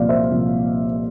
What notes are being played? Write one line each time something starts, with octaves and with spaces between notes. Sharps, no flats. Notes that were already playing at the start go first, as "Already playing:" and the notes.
Already playing: C2 A#2 F3 D5 F5
C5 E5
C2 A#2 F3